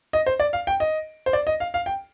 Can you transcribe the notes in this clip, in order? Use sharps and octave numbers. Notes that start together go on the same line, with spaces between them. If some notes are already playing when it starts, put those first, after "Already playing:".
D#5
C5
D5
F5
G5
D#5
C5
D5
D#5
F5
F5
G5